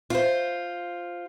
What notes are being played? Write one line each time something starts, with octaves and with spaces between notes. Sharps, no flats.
F4 C5